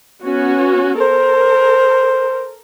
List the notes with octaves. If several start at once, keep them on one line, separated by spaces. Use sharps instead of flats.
B3 C#4 F#4
A4 A#4 C5